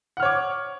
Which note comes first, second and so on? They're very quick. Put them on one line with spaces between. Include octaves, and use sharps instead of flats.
F#5 F6 C#5 D6